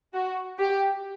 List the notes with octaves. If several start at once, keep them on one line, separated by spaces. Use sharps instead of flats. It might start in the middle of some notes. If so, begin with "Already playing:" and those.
F#4
G4